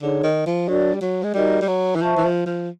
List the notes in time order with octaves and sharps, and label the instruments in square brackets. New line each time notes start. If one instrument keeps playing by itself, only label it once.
[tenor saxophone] D3 [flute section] D#4 G#4 C#5
[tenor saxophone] D#3
F3
[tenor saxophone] F#3 [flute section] D4 F#4 A#4 D5
[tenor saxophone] G3
F#3
G#3
[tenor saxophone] G3 [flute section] D#4 F#4 A#4 D#5
[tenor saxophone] G3
F#3
E3
[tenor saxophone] F3 [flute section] C5 E5 A5 C#6
[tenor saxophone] E3
F3
F3